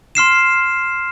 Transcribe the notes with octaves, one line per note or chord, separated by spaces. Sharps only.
C6 F6 C7 E7